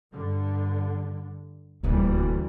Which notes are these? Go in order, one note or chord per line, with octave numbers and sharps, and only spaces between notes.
G2 D3
D#1 D2 E3 G3 C#4